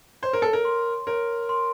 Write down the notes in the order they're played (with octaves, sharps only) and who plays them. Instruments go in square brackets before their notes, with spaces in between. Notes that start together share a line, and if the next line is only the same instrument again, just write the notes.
[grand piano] C5 [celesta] C#5
[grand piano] A#4
A4
A#4
[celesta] C6
[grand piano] A#4 [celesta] C#5
[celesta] C6